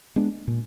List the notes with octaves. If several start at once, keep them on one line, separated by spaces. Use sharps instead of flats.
G#3 B3 D4
A#2